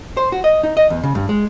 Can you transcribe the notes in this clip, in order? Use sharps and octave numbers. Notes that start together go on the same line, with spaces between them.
C5
F#4
D#5
D#4
D#5
E2
C#3
G2
G#3